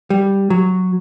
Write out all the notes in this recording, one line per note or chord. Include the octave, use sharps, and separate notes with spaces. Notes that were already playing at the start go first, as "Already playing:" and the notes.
G3
F#3